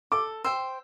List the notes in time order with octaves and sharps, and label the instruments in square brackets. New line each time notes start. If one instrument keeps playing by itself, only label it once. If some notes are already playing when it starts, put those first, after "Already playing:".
[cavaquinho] A4 [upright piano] D6
[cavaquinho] C5 G5 [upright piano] E6